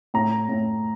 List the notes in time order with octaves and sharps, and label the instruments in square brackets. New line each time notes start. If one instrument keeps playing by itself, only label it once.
[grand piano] A2 A#5
A2